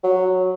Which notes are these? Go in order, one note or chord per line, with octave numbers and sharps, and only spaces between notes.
F#3